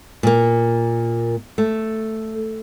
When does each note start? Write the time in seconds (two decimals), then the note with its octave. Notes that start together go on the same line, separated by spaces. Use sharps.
0.23 A#2 A#3
1.58 A3